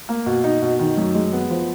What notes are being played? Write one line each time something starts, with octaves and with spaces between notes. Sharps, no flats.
A#3
B2
D#4
B2
D#3
F#2
G#3
B3
F3